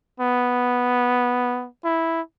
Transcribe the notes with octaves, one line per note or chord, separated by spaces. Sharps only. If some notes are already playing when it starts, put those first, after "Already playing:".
B3
E4